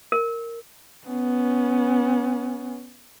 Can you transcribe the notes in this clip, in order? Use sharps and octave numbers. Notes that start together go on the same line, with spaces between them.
A#4
B3 C#4